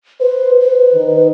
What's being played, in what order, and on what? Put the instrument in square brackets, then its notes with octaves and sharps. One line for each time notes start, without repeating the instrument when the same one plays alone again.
[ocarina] B4 [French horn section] C5
[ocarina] B4
[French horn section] D#3 D#4